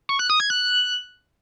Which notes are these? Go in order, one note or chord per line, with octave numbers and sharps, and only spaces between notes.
C#6
F#6
D#6
G#6
F#6